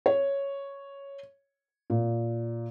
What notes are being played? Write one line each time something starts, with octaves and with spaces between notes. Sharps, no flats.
C#5
A#2